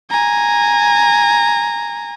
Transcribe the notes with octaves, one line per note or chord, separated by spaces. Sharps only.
G#5 A#5